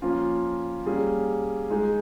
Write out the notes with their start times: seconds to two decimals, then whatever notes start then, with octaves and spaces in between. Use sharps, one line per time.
0.02 F3 A#3 C#4 F4
0.86 G3 A#3 C#4 G#4
1.70 G#3 D#4 G#4